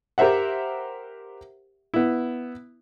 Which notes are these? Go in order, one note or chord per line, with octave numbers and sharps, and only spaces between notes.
G4 A#4 C5 E5 F#5
B3 E4